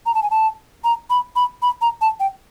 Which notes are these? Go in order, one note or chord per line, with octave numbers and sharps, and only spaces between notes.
A#5
A5
G#5
A5
A#5
B5
B5
B5
A#5
A5
G5